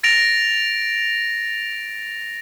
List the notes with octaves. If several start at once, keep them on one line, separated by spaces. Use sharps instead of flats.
A6 A#6 D7 F7